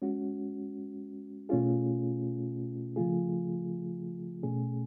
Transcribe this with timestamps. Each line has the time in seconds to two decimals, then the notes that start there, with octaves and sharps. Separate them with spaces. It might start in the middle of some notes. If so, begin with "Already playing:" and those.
0.02 G#3 C#4 F#4
1.49 B2 A3 C#4 F4 G#4
2.96 C#3 F3 A3 F4 G#4
4.43 B2 A3 C#4 G#4